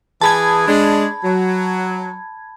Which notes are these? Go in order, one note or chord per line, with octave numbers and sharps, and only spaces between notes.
E3 G#4 A5 B5 G#6
G#3 D4
F#3